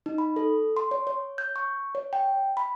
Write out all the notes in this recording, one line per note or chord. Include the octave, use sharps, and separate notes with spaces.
D#4
B5
A4
C6
C#5
C#5
G6
C#6
C#5
G5
B5